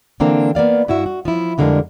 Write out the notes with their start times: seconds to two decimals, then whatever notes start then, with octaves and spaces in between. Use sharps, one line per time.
0.20 D3 E3 A#3 C4 D4 A#5
0.55 A#3 B3 D5 F5
0.88 G2 E4 F#4 E5
1.06 F#4
1.25 F3 E4
1.58 F2 D3 G3 G#3 D4 A#4